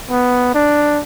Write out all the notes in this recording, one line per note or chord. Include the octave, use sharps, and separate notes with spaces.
B3
D4